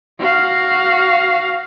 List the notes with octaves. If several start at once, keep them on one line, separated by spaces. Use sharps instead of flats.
F#4 F5